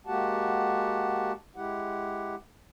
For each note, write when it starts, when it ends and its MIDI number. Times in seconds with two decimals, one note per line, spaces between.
0.07 1.32 56
0.07 1.32 58
0.07 1.32 66
0.07 1.32 67
0.07 1.32 78
0.07 1.32 81
1.56 2.35 56
1.56 2.35 64
1.56 2.35 67
1.56 2.35 78